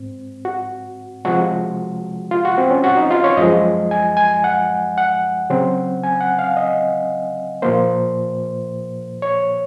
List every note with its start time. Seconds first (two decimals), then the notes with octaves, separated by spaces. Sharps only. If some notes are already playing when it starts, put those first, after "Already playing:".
Already playing: G#2 C4
0.45 F#4
1.25 C3 F3 G#3 F#4
2.31 F4
2.45 F#4
2.58 C4
2.71 C#4
2.84 F#4
2.97 D#4
3.11 F4
3.24 C#5
3.37 F#2 F3 G#3 D#5
3.91 G#5
4.17 G#5
4.44 F#5
4.98 F#5
5.50 C#3 F#3 C4
6.03 G#5
6.21 F#5
6.39 F5
6.57 D#5
7.62 A#2 F3 A#3 C5
9.22 C#5